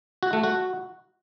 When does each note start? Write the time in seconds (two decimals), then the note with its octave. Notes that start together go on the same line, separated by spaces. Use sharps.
0.23 F#4
0.33 A3
0.43 F#4